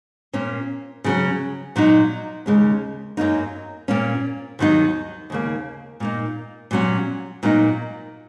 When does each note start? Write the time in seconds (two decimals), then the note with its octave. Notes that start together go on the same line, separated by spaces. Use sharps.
0.33 A#2 A#3 C#4
1.04 C#3 F#3 C#4
1.76 A#2 F#3 D#4
2.46 D#2 C#3 G#3 C#4
3.17 F#2 F#3 A#3 D#4
3.88 A#2 A#3 C#4
4.59 D#2 D#3 F#3 D#4
5.30 D#2 C#3 A#3
6.00 A#2 A#3 D#4
6.71 A#2 F#3 C#4
7.43 A#2 F#3 A#3 D#4